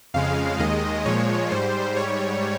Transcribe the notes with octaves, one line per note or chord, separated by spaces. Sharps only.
F2 C#3 G#3 F5
D#2 D#3 G#3 D#5
A#2 F3 G#3 C#5
G#2 G3 C5
G#2 G3 C#5